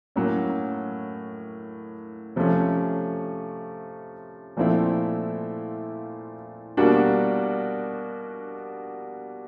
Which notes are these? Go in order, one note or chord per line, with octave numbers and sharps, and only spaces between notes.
A2 F#3 A#3 C#4
C3 F3 A3 C#4
A#2 F3 A3 C4 E4
B2 G3 A#3 D4 F#4